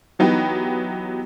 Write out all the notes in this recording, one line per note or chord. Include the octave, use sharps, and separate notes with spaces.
E3 F#3 B3 D#4 G4